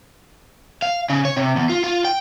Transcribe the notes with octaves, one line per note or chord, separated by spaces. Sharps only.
F5
C#3
C#5
C3
E2
F4
F4
G5